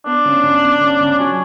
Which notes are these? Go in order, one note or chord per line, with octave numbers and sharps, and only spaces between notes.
B3 D4
C#3
C#3
B3
C#3
C#3
F#3 C#4